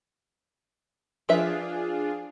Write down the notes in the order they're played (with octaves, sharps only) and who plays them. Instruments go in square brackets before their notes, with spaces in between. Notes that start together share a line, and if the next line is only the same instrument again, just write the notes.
[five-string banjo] F3 B4 E5 [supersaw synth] D4 F4 G#4